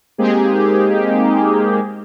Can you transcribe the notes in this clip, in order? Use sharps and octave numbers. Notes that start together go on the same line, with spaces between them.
G#3 A#3 C4 D#4 G4 G#4